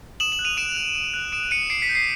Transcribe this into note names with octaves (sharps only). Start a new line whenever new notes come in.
D#6 E7 F#7
E7 F#7
F#6
D#7 F7
D#6 D7 E7
F#6
D#6
F#6
D#6 D7 E7
F#6 C#7 D#7
D6 C7 D7
B6 C#7
G6
C7